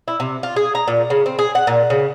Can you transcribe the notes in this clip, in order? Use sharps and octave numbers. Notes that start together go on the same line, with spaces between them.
E4
C3
F4
G#4
A#5
A#2
C#3
C4
G#4
F#5
A#2
C#3